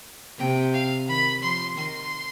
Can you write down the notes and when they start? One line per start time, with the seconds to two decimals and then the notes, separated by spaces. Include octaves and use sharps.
0.38 C3 G5
0.73 F5
1.07 D#3 B5
1.41 F3 C6
1.76 D#3 C6